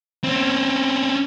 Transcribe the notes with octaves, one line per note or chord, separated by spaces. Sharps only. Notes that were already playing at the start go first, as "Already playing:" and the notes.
C4 C#4